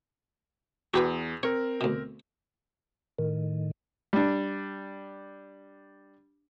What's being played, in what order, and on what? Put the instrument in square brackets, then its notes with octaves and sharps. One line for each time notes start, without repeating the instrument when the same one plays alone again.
[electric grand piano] E2 [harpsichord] F#4 G4 B4
[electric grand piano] C4 A#4 [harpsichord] C#5
[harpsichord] D2 B2
[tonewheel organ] A2 D#3
[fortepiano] G3 D4